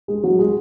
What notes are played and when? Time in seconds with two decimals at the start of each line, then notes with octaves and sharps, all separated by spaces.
0.08 G#3
0.23 F#3
0.39 G#3